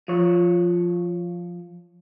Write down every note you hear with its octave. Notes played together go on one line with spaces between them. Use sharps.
F3 C#5